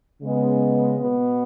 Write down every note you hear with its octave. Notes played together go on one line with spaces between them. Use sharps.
C#3 G#3 B3
B2 B3